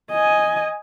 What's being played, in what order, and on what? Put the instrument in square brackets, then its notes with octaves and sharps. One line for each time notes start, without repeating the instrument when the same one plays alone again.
[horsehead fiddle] D#5 G#5